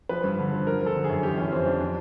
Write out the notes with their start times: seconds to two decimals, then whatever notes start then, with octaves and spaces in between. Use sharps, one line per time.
0.09 F3 B4
0.24 G2
0.39 D3
0.53 F3
0.67 F3 A#4
0.81 F3
0.86 A4
0.95 D3
1.04 G#4
1.09 F#2
1.23 E3 G4
1.38 E3 C#4
1.52 F2 C4
1.66 F2 D4
1.81 D4